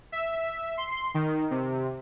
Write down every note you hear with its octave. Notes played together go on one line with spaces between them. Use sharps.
E5
C6
D#3
C3